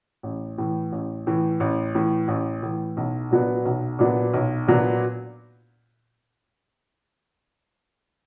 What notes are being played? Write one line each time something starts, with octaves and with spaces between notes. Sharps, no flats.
A1
A2 E3
A1
A2 E3
A1
A2 E3
A1
A2 E3
B1
A#2 F#3 B3 D4
B1
A#2 F#3 B3 D4
B1
A#2 F#3 B3 D4